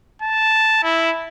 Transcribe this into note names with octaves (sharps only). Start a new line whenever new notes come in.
A5
E4